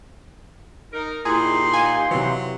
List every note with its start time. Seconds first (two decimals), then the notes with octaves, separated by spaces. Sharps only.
0.91 D#4 A#4
1.25 A#2 D#4 E4 G4 G#4 C6
1.73 F5 G#5
2.11 C3 E3 F#3